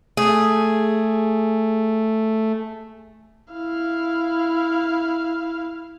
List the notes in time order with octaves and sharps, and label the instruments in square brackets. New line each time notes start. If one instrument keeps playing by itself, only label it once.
[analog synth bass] A3 [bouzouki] G#4
[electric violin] E4 F5